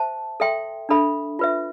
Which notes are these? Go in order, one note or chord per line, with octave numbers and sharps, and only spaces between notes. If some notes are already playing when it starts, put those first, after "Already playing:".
Already playing: C5 E5 A5
A4 E5 G5 C6
D4 A4 E5 B5
F4 B4 E5